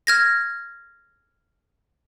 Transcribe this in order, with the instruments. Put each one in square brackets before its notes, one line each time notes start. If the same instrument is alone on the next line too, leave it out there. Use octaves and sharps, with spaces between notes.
[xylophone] F6 G#6 A#6